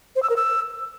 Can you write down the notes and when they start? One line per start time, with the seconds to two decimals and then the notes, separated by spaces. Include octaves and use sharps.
0.16 C5
0.23 E6
0.30 A#4
0.37 E6